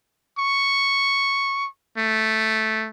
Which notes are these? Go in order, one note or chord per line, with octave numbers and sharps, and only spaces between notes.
C#6
A3